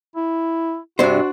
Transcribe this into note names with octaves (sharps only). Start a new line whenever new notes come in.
E4
G2 C3 D4 F#4 C5